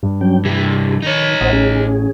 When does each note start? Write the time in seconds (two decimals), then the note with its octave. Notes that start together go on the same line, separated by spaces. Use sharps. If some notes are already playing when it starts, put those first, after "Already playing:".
0.03 G2
0.21 F#3 C#4 G5
0.45 C2 E3 G4
1.02 D#3 D#4 C#5
1.41 A1 C5 D#5 F#5
1.53 A1 C#4 G#4